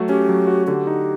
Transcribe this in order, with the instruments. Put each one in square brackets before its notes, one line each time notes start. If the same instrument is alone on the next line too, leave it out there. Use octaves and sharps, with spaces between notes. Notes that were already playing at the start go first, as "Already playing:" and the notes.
Already playing: [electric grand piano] F#3 A3 F#4
[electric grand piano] C#4 [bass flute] G4
[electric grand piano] F#3
F#4
[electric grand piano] D3 [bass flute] G4
[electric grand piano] D#4